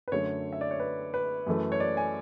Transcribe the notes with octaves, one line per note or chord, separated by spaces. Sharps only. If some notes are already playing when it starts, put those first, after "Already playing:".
B4
F#2 D3 A3 C#5
E5
D5
C#5
B4
B4
F#2 E3 A3
C#5
D5
G#5